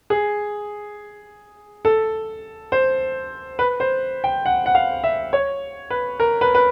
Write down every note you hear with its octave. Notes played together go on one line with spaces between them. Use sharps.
G#4
A4
C5
B4
C5
G5
F#5
F#5
F5
E5
C#5
B4
A#4
B4
B4